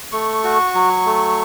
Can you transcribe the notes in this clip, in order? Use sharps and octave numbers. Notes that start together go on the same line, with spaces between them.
A3 C#6
F#4
F#3
A3